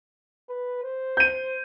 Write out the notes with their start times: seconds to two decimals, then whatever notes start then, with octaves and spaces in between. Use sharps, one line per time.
0.49 B4
0.83 C5
1.17 G6 D#7